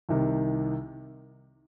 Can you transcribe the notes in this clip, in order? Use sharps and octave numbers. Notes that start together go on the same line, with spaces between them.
C2 C3 D#3